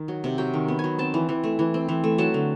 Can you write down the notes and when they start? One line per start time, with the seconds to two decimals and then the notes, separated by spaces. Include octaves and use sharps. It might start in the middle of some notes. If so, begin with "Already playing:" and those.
Already playing: D#3
0.08 F#3
0.24 C3
0.38 F#3 G5
0.54 D#3
0.68 B3
0.79 G#5
0.84 F#3
0.99 C4 A5
1.14 E3
1.29 E3
1.44 A3
1.59 E3
1.74 C4
1.89 E3
2.04 A3
2.18 F#3 A5
2.34 D3